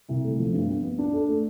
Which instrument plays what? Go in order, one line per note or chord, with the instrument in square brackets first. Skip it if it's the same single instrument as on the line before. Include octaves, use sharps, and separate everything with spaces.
[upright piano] C2
A3
F3
G2
B3
B3
D4
A4
A3